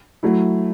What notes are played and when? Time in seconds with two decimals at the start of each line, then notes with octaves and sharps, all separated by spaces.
0.23 F#3 A3 E4